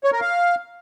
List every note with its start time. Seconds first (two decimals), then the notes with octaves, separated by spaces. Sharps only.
0.04 C#5
0.12 A#4
0.21 F5